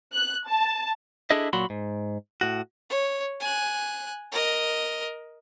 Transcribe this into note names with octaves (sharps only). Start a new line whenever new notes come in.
F#6
A5
D4 E4 G#4 A4 D#5 E5
A#2 F#3 F#4 B5 C6
G#2
A2 F#4
C#5
G#5 F#6
A#4 D#5